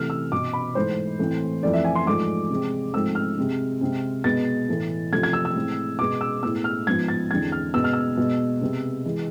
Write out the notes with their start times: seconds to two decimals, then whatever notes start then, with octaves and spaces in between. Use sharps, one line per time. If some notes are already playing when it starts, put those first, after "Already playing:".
Already playing: C3 E3 A3 F6
0.10 E6
0.32 B2 B3 D6
0.53 B5
0.75 G#2 E3 A3 C5
1.19 A2 E3 A3 C4
1.63 F2 E3 A3 C4 D5
1.73 E5
1.85 G#5
1.95 C6
2.06 G#2 F3 A3 D6
2.50 C3 G#3 C4
2.94 G#2 F3 A3 C4 E6
3.15 F6
3.37 C3 G#3 C4
3.81 C3 G#3 C4
4.24 B2 G#3 B3 A6
4.69 A2 E3 A3
5.12 C3 F3 A3 G#6
5.23 G#6
5.33 E6
5.45 E6
5.55 A2 G#3 C4
5.99 B2 G#3 B3 D6
6.21 E6
6.42 A2 G#3 B3 E6
6.64 F6
6.87 G#2 F3 B3 G#6
7.08 A6
7.30 E2 D3 G#3 C4 G#6
7.52 F6
7.74 B2 G#3 B3 E6
7.84 F6
7.93 E6
8.17 B2 G#3 B3
8.61 C3 G#3 B3
9.05 E3 G#3